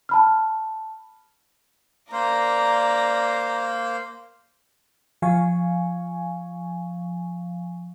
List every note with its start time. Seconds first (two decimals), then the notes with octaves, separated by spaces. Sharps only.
0.09 A5 B5 F6
2.12 A#3 C5 D5 A#5
5.22 F3 F5 G#5 C#6